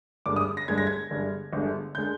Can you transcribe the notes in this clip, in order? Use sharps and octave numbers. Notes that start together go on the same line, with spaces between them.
G1 G2 D3 G#3 D6
D#6
A#6
G1 G2 D3 G#3 G#6
A#6
G#6
G1 G2 D3 G#3
G1 G2 D3 G#3
D3 G#3 G6